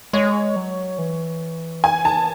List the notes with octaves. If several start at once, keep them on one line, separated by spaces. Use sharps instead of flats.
G#3 C#5
F#3
E3
G#5
A5